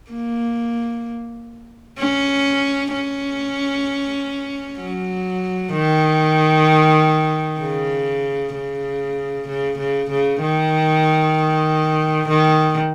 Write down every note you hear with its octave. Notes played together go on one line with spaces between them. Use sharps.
A#3
C#4
C#4
F#3
D#3
C#3
C#3
C#3
C#3
C#3
D#3
D#3